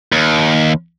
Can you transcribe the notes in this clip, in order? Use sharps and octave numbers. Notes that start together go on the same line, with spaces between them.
D#2